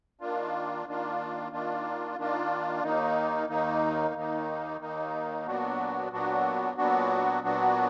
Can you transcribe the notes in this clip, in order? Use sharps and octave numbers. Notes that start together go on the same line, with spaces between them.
D#3 A#3 D4 F4
D#3 A#3 D4 F4
D#3 A#3 D4 F4
D#3 A#3 D4 F4
D#2 D#3 A#3 D#4
D#2 D#3 A#3 D#4
D#2 D#3 A#3 D#4
D#2 D#3 A#3 D#4
A#2 F#3 B3 D4 F#4
A#2 F#3 B3 D4 F#4
A#2 F#3 B3 D4 F#4
A#2 F#3 B3 D4 F#4